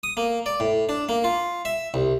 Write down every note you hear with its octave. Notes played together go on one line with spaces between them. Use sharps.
D#6
A#3
D5
A2
D4
A#3
F4
E5
C2